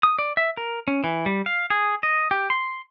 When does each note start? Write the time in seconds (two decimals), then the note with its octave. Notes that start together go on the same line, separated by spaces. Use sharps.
0.03 D#6
0.19 D5
0.37 E5
0.57 A#4
0.88 C#4
1.04 E3
1.26 G3
1.46 F5
1.70 G#4
2.03 D#5
2.31 G4
2.50 C6